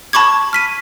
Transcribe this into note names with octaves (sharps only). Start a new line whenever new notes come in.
A5 B5 C#6 D6 G#6
F6 B6 D#7